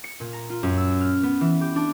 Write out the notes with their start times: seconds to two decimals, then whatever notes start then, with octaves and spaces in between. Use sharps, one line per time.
0.04 C#7
0.20 A#2
0.33 A#5
0.50 F4
0.63 F#2
0.77 E6
1.01 F6
1.23 B3
1.41 E3
1.61 G4
1.76 D4